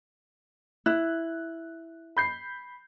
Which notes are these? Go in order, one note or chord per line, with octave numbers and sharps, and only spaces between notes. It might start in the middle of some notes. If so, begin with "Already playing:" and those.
E4 F#6
B5 G6 C7